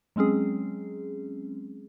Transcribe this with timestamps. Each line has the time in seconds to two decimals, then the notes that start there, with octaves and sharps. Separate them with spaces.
0.16 F#3 G#3 C4 C#4 G#4